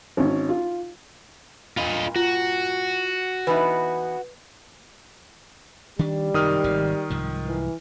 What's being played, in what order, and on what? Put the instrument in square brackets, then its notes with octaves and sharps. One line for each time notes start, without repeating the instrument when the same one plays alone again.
[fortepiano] G#1 C#4
F4
[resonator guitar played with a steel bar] G2 A#2 [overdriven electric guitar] F4 D#5
[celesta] F4 [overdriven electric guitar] F#4
[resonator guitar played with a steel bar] E3 B3 D#4 [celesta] B4
[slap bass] D#3 D4 [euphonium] G3
[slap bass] F#2 C3 [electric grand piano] D#3 D#6 F6
[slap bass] G#1 C3
C2 G#2 F3
[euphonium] E3